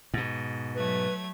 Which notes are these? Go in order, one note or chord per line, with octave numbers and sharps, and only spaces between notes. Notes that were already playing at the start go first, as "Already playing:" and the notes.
G#2 B2
F#3 A3 B4 G#6